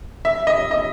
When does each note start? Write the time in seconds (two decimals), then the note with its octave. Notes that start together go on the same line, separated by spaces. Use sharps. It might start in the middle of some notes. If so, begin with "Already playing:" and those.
0.25 E5
0.47 D#5
0.71 D#5